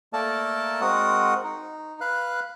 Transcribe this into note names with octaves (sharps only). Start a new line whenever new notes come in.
A3 A#3 A4 A#4 D5 A5
G#3 C4 F#4 A#4 F#5 D#6
D#4
B4 F5 F#6